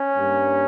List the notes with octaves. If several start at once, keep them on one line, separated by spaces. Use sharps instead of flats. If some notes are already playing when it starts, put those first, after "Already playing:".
Already playing: C#4
G2 G3 A#3